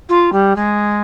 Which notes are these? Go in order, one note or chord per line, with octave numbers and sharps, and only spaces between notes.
F4
G3
G#3